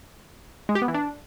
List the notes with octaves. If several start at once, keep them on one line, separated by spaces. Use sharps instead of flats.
G#3
G4
B3
E3
D4